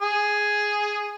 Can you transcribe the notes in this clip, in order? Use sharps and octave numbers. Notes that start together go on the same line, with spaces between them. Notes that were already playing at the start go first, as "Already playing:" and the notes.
G#4